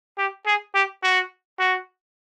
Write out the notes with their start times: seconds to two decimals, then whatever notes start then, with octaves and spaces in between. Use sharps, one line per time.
0.18 G4
0.46 G#4
0.74 G4
1.03 F#4
1.59 F#4